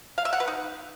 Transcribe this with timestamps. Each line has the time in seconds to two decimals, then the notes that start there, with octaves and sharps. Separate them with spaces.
0.18 F5
0.25 E5
0.33 F#5
0.40 B4
0.48 D#4